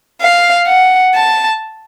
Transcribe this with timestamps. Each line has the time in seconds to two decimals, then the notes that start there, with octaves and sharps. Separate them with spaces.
0.21 F5
0.67 F#5
1.14 A5